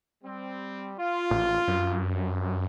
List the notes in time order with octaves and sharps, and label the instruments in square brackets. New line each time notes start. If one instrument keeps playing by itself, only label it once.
[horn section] G3 C4
F4
[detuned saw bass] A1
F#2